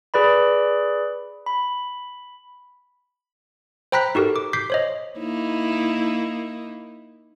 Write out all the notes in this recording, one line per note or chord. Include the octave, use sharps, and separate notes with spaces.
G#4 B4 D5 B5
B5
C5 G5 A#5 B5 F#6 B6
D#4 F#4 G4 A4 A#4
D6
D6 G6 B6 C7
C5 C#5 D#5
A#3 D#4 E4